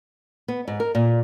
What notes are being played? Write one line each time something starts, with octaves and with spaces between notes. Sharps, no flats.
B3
G#2
A#4
A#2